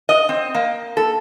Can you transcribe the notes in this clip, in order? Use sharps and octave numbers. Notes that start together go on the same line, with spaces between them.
D#5
C4
A#3
A4